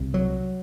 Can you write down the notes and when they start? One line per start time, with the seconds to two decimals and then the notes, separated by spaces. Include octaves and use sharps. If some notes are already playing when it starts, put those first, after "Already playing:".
Already playing: C2 C3
0.14 F#3